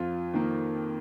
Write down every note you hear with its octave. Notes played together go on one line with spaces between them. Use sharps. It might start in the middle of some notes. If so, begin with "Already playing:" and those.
Already playing: F2 F4
D#3 A#3